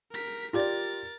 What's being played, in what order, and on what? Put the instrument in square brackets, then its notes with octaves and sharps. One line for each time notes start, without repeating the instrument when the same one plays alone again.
[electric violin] A#4 B6
[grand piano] F4 G4 D5 [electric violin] A#4 A6